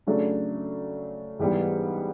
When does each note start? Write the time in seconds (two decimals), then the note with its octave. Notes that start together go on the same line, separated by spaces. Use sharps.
0.07 C#3 F#3 A3 D4
1.39 G#2 E3 G3 B3